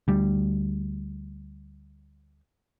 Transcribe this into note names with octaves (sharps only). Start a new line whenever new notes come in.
D2 G3